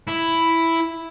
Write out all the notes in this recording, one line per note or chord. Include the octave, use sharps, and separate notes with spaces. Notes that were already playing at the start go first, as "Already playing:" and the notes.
E4